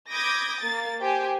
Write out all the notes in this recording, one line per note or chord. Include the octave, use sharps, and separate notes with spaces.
B5 D6 D#6 G6 G#6 A#6
A#3 A6
G4 C5 G#5